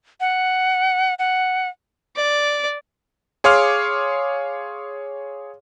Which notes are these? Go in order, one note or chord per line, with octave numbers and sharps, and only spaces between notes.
F#5
F#5
D5
G#4 C#5 F5 C6 D6 F6